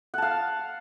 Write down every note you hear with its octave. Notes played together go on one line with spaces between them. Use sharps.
F5 F#5 A5